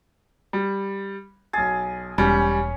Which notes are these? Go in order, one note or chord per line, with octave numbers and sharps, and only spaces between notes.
G3
B1 G#4 A6
E1 G3 C#4